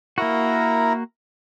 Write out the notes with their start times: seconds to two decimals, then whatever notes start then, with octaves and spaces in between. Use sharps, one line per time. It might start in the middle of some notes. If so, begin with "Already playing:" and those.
0.18 A#3 E4 F#4 A#4 A#5